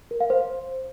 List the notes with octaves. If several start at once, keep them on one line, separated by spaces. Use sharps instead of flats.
A#4
F5
C5